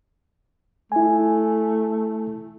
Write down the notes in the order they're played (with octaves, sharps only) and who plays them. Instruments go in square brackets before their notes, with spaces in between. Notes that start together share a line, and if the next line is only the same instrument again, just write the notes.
[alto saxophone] A3 [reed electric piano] E4 G#5